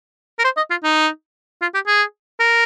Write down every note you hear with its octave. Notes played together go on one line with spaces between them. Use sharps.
A#4
C5
D#5
F4
D#4
F4
G4
G#4
A#4